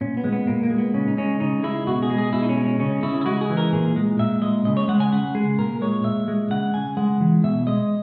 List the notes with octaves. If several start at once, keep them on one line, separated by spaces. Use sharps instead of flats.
A#2 C#4
B3
G#3
B3
A#2 A#3
A#3
G#3
B3
C#3 C#4
D#4
G#3 C#4
C#3 D#4
G#3 E4
B2 F#4
G#4
G#3
G#4
B2 E4
D#4
C#4
G#3
C#4
C#3 C#4
C#3 E4
E4
G#3 F#4
G#4
E3
A#4
A#2 G#4
G#3
A#2 E5
G#3 D#5
C#3 D#5
C#5
G#3 F#5
G#5
C#3 F#5
G#3 G#4
A#2 A#4
G#3 C#5
A#2 E5
G#3
C#3 F#5
C#3 G#5
G#3 F#5
E3
B2 E5
G#3 D#5